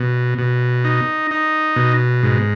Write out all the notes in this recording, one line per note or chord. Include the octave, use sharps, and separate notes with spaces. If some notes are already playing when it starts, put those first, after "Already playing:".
Already playing: B2
B2
D#4
D#4
B2
G#2